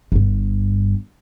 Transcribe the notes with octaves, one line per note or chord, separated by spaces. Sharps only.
G1 G2